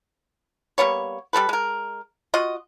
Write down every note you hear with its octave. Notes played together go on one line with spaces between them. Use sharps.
G3 A#3 B3 C#5
G3 C4 A4 B4
G#3 A#4
F4 F#4 D#5